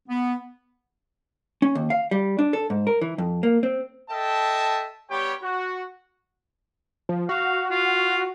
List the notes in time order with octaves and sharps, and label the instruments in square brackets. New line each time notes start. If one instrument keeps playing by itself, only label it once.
[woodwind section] B3
[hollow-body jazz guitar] C#4
D#2
F5
G3
D4
A4
G#2
A#4
E3
F2
A#3
C4
[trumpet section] A4 D#5 E5 G5 A5
G3 B3 G4 C#5 G5
F#4
[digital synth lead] F3
[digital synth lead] F#4 [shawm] F5
[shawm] F4